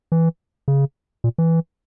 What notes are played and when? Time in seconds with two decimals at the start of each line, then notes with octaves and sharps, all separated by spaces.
0.12 E3
0.68 C#3
1.24 A#2
1.38 E3